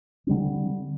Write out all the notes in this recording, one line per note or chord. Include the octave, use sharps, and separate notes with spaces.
D3 G3 C4